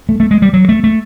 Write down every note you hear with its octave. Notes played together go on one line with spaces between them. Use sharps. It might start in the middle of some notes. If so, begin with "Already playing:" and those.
A3
A3
G#3
G3
F#3
A3
A3